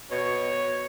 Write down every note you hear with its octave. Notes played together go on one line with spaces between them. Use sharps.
B2 C#5